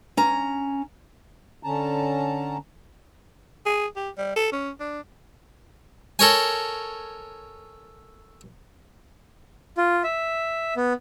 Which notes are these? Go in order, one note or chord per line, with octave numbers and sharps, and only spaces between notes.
C#4 A#5
D3 C#4 A5 A#5
G#4
G4
G3
A4
C#4
D4
A4 A#4 C#5 G#5
F4
E5
B3